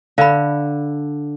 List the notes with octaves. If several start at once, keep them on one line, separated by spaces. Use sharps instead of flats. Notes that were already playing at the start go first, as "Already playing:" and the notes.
D3 F5 B5